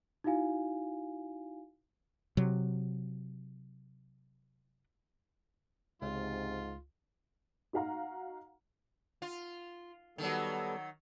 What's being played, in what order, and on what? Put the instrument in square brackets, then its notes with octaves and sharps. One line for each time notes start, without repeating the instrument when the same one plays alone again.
[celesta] D#4 E4 F#4 F5 G#5
[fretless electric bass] C3 F#3
[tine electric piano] C#2 [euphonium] G#2 [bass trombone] C3 [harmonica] F4
[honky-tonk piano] D#4 F#4 F5 F#5 A#5
[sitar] F4
[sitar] D#3 F#3 [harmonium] G3 B3 A4